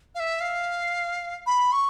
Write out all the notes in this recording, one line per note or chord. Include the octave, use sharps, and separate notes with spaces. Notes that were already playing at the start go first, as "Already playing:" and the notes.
F5
E5
F5
B5
C#6